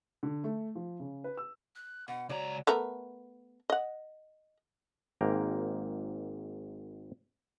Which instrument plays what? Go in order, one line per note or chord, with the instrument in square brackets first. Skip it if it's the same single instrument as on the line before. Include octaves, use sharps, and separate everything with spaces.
[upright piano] D3
A3
F3
C#3
B4
E6
[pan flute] F#6
[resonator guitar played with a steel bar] B2 [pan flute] F#5
[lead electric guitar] C#2 A#5 [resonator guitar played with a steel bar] F#3 D5 [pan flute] C#5
[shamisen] A3 B3 A#4
D#5 F#5
[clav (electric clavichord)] G#1 G#2 A#3 G5 A#5